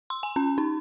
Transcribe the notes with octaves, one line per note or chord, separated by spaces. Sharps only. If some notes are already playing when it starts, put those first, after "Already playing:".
C6
G#5
C#4
D#4